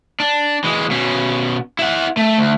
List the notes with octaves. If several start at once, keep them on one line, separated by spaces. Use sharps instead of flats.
D4
E3 G#3
B2 C#4
E4 F#5
A3
D2